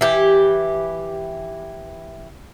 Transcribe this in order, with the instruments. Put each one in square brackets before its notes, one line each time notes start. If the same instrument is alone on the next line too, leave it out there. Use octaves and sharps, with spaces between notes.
[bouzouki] E3 G4